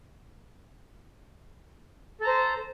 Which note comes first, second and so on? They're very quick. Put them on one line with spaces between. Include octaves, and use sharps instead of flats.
A4 A#5 C5